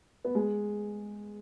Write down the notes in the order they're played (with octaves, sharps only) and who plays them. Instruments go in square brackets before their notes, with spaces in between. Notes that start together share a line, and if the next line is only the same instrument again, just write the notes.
[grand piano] B3
G#3